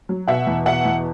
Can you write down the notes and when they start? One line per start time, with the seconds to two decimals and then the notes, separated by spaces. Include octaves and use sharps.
0.09 F#3
0.28 B2 E5 F#5
0.47 E2
0.65 B2 E5 F#5
0.85 E2